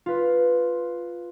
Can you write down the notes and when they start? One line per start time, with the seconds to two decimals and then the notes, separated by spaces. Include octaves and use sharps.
0.06 F4 B4